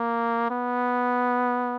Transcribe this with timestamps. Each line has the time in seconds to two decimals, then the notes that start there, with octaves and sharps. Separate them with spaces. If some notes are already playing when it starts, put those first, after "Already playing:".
Already playing: A#3
0.51 B3